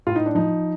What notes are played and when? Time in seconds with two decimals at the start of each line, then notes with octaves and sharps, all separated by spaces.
0.07 A2 F4
0.16 D#4
0.26 D4
0.35 F3 D#4